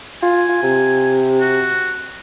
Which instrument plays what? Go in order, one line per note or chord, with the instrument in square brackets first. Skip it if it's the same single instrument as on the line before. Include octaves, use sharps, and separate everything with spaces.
[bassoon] F4 [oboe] G#5
[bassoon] F4
C3
[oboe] F#4